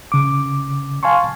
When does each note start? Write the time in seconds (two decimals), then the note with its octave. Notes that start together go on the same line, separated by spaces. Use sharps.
0.12 C#3 D6
1.03 F5 G#5 A5 C6 C#6